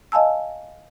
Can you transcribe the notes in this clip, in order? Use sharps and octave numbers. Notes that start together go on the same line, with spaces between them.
D#5 F5 G#5 A5 E6